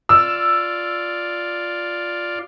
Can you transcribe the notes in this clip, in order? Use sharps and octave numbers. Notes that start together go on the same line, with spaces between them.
F4 D5 E6